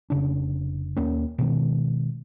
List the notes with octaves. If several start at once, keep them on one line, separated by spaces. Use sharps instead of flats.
F1 C#3 D4
D#2 A#3 C#4
B2 D#3 G#3